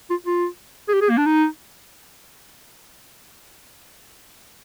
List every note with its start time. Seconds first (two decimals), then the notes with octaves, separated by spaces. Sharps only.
0.10 F4
0.26 F4
0.88 G#4
0.93 G4
1.01 G#4
1.10 A#3
1.18 D4
1.26 D#4